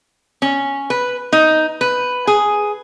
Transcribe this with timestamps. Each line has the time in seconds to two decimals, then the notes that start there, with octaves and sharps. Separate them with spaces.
0.42 C#4
0.90 B4
1.33 D#4
1.81 B4
2.27 G#4